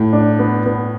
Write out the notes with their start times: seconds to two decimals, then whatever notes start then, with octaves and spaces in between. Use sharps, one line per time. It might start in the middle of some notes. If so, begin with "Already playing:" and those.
Already playing: A2
0.13 D4
0.39 B3
0.66 B3